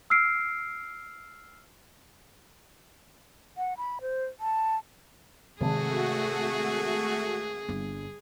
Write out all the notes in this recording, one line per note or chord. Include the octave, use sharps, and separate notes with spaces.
E6 F6 C7 D7
F#5
B5
C5
A5
G#1 C3 A3 F#4 G#4 A5
G1 G2